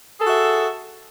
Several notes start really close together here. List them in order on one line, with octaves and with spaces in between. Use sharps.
G#4 A4 F#4 E5